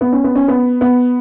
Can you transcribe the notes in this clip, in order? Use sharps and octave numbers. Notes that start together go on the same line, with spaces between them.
B3
C#4
B3
C#4
B3
B3